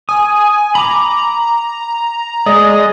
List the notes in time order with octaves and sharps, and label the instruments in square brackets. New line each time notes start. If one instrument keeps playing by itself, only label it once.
[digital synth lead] G#5 [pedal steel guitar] D#6
[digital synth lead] A#5 [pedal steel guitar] B5 D6
[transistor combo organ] G#3 D#5 [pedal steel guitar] D5